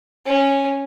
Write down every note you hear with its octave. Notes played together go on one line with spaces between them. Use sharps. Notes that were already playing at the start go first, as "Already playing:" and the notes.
C#4